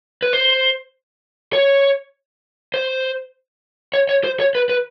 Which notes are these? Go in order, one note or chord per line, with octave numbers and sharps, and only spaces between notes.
B4
C5
C#5
C5
C#5
C#5
C5
C#5
B4
B4